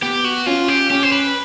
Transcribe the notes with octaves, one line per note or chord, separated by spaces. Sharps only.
B3 G4
F#4
C#4 F4
G4
C#4 G4
C5
B4